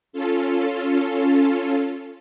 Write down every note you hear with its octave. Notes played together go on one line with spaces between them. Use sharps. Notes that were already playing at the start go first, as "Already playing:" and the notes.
C#4 F4 A4